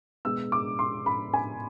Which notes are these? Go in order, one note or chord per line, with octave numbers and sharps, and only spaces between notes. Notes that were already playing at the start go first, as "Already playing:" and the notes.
B2 G#3 B3 E6
D6
C6
B5
G#5